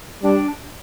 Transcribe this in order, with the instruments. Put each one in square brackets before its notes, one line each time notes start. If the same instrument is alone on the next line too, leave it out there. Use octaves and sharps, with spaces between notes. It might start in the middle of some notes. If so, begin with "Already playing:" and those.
[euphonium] G3 [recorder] D4